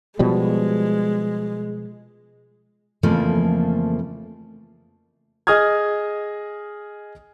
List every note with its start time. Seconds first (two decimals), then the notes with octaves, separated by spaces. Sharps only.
0.19 B2 F3 G3 G#3
3.03 F2 C#3 E3 F3 A3 A#3
5.47 G#4 D#5 D#6 F6 G#6